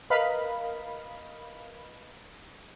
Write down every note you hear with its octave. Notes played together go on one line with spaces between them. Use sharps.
A#4 B4 D#5 F5 B5